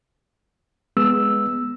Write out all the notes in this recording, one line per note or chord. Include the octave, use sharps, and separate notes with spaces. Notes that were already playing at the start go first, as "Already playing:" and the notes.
G#3 B3 E6